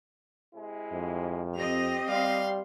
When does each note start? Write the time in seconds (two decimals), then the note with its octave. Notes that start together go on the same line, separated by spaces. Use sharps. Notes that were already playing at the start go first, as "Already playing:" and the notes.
0.54 C3 G#3 E4
0.93 F2
1.56 C4 G4 D#5 F7
2.08 G3 F5 C6